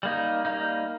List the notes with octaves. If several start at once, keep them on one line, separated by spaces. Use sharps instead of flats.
G3 A#3 D#4
G3 A#3 D#4